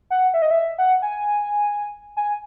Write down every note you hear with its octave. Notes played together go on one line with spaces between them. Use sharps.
F#5
E5
D#5
E5
F#5
G#5
G#5